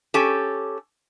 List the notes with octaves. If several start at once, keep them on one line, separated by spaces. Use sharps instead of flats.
C#4 G4 A4